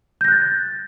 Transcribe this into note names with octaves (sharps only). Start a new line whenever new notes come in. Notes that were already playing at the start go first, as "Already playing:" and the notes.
F#6 G6 A6 A#6